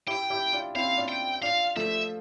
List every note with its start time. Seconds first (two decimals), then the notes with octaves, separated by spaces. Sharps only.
0.07 E4 G4 G5
0.30 E4 G4
0.53 D4 F4
0.75 C4 E4 F5
0.97 D4 F4
1.09 G5
1.42 D4 F4 F5
1.76 F3 A3 E5